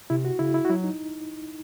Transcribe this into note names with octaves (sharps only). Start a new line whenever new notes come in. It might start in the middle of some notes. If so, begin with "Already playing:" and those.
C3 E4
F#4
C#3 E4
E4
F#4
F#3 E4
D#4